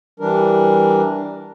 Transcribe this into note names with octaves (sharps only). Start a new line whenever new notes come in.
E3 G3 D4 A#4